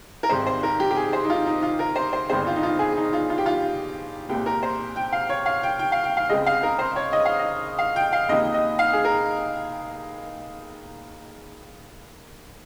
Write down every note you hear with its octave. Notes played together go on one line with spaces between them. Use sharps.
A#4
G#1 G#2 G3 C4 C5
C5
A#4
G4
G4
G#4
C5
D#4
F4
D#4
F4
A#4
C5
C5
G1 G2 D#3 G#3 C4 C5
F4
D#4
F4
G#4
D#4
F4
F4
G4
F4
C2 A#2 G#3 C4 G4
A#4
C5
G5
F5
C#5
F5
G5
G5
F5
G5
F5
C#2 C#3 G#3 C4 D#5
F5
A#4
C5
C#5
D#5
F5
D#5
F5
G5
F5
C#2 C3 D#3 A#3 D#5
D#5
F5
G#4
A#4